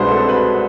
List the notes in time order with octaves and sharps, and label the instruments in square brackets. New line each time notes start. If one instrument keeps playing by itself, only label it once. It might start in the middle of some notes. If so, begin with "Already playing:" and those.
Already playing: [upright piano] C2 B2 G#3 D4 [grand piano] B4 C5
[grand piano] A4
B4